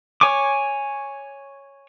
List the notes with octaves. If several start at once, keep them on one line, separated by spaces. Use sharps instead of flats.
C#5 G#5 C#6 D6